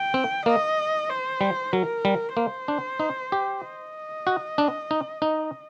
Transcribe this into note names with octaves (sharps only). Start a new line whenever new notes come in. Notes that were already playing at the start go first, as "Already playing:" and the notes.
Already playing: G5
C4
A#3 D#5
C5
G3
F#3 A#4
G3
A#3 C5
D4
D#4
G4
D#5
F#4
D4
D#4
D#4